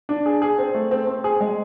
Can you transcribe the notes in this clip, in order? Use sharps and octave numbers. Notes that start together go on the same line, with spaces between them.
D4
G#4
G#4
C4
A3
C4
C4
G#4
G#3